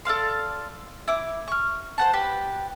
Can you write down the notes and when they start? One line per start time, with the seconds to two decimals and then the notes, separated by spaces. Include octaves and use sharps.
0.05 A4 D5 F5 C6
1.08 E4 D6
1.48 C#6 F6
1.98 C5 F#5 A5
2.13 G4 B4